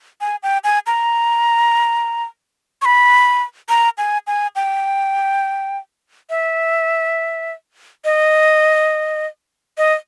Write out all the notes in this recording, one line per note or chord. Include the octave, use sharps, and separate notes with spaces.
G#5
G5
G#5
A#5
C#6
B5
A#5
G#5
G#5
G5
E5
D#5
D#5